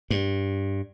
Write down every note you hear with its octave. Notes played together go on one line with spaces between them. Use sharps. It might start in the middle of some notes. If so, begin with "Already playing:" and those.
G2